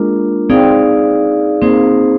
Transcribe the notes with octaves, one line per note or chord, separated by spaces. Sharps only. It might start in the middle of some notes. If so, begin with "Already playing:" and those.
Already playing: G#3 A#3 D4 F4 A#4
C4 D#4 G#4 D5 F5
A#3 C4 D#4 G#4 C5